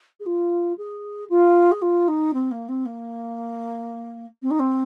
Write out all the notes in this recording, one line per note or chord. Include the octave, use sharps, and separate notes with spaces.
G#4
F4
G#4
F4
G#4
F4
D#4
C4
A#3
C4
A#3
C4
D#4
C4